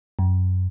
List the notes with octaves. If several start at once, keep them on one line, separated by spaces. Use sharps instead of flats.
F#2